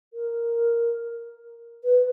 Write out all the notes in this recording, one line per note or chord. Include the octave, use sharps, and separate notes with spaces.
A#4
B4